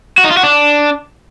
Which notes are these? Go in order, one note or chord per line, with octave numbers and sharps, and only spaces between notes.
F#4
D#4
F4
F#4
D4